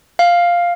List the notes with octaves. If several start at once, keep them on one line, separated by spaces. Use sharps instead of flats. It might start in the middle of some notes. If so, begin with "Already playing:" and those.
F5